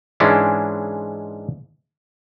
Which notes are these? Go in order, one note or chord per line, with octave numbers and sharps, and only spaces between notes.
G#2 E3 G#3 C#4 D4 E4